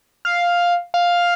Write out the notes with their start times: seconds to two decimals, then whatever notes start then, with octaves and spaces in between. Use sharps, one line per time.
0.25 F5
0.94 F5